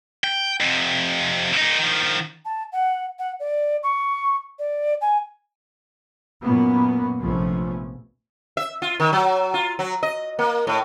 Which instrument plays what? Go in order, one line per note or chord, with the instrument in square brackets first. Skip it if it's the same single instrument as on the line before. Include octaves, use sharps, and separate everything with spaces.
[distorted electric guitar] G5
F2 C3
A#2 D#4
D#3 F3
[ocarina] A5
F#5
F#5
D5
C#6
D5
G#5
[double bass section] F#2 A#2 A#3 B3 C#4
A#1 C3 F3 A3 B3 C#4
[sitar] E5
F4
D#3
F#3
F4
F#3
D#5
A#3
A2